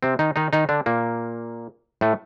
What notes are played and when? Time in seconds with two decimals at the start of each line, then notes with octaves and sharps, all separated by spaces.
0.03 C3 C4
0.19 D#3 D#4
0.36 D#3 D#4
0.53 D#3 D#4
0.69 D3 D4
0.86 A#2 A#3
2.01 A2 A3